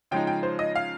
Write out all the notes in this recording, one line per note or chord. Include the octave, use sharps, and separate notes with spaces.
C#3 F3 G#3 D#4 G5
G5
C5
D#5
F5